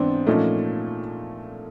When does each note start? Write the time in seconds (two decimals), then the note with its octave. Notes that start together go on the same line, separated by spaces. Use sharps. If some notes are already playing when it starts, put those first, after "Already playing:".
Already playing: G#2 E3 B3 C4 D4
0.26 A#2 F3 A3 C#4 D#4